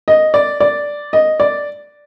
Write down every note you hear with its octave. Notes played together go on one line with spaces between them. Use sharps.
D#5
D5
D5
D#5
D5